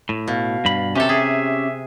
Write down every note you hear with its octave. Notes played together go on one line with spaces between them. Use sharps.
A2
B2 F5
G2 B5
C3 C#4 G4 A4
G#4 E5